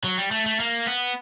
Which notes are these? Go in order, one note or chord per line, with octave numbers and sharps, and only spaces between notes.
F#3
G3
A3
A3
A#3
B3